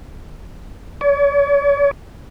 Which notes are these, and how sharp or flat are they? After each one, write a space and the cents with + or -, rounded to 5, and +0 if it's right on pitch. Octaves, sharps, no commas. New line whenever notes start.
C#5 +40